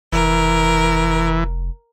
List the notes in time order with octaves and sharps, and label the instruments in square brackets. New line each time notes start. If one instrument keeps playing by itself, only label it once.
[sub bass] F1 [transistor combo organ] E3 [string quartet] A#4